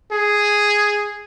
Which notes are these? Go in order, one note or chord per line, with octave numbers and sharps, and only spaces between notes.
G#4